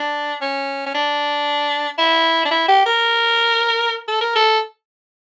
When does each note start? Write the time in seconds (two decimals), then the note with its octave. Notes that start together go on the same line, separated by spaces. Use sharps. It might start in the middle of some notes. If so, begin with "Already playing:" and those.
Already playing: D4
0.41 C#4
0.86 C#4
0.94 D4
1.98 E4
2.45 D4
2.51 E4
2.68 G4
2.86 A#4
4.08 A4
4.21 A#4
4.36 A4